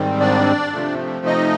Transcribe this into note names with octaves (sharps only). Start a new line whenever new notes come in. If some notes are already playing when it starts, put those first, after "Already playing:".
Already playing: G#2 D#3 G3 C4
D4 D5
C3 F3 A3
D#4 D#5